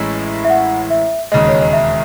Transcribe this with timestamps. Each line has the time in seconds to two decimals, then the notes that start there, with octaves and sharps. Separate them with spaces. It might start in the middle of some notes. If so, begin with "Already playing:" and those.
Already playing: A1 A2 G#3 C#4 E4
0.45 E5
0.50 F#5
0.90 E5
1.32 E1 D#2 C#3 G#3 D#5
1.48 C#5
1.61 D#5
1.73 E5